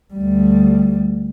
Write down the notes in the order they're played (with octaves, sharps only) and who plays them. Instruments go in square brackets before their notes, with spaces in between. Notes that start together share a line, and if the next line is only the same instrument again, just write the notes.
[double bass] D2 G3